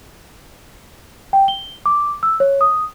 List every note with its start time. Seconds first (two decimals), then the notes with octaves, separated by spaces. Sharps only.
1.33 G5
1.48 G7
1.86 D6
2.23 E6
2.40 C#5
2.61 D#6